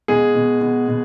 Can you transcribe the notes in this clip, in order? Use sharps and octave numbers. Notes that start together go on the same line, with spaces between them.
B2 G#3 G#4
B2
B2
B2